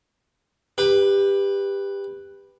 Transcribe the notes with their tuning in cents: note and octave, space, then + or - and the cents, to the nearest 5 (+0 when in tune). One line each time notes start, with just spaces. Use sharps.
G4 +20 B4 +0